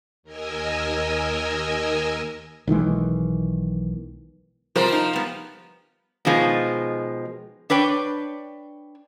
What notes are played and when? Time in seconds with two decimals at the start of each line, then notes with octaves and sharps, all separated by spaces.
0.23 D#2 A#4 D#5 G#5 E6
2.67 B1 D#3 E3 G#3
4.76 C3 F3 G3 A#4 C5
4.93 D#4
5.13 G3 B3
6.25 B2 D#3 F3 G#3
7.70 D4 B4 C#5 G5